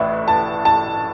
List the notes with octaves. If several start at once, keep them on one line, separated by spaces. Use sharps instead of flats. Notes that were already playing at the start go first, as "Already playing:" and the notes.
Already playing: A1 A2 B4 D5 E5
A5
A5